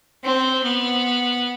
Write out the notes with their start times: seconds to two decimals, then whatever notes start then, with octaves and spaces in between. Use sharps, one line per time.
0.24 C4
0.63 B3